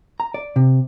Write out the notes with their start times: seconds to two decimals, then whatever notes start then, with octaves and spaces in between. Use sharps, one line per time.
0.20 A#5
0.34 D5
0.56 C3